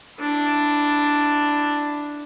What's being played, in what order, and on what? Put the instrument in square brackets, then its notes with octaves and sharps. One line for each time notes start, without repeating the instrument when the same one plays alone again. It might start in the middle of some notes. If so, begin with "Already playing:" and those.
[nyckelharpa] D4 E4